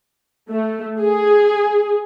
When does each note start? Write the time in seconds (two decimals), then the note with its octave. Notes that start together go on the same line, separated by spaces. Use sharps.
0.50 A3
1.00 G#4